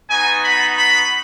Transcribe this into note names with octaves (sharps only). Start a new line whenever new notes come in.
B3 D#4 F#4 G#5
B5
B5